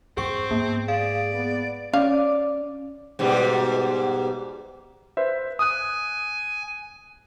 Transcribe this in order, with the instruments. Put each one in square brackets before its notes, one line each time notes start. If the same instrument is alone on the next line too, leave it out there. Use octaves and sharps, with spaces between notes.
[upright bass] E2 G2 [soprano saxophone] C4 [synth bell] G#4 C#6
[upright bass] G#2 [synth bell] A#3 [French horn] B3
[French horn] G#4 [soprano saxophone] D5 [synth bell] F5
[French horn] B3
[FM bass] C#4 [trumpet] D5 [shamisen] F5
[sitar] G#2 B2 G3
[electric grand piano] B4 C5 E5
[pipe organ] G#5 [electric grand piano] D#6 F#6